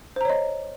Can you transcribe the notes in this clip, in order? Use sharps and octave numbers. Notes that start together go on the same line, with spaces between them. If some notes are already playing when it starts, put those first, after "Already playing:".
C5 C#5 D#5 A#5